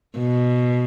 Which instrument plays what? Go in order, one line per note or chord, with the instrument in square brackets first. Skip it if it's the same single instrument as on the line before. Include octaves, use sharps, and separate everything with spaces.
[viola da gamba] B2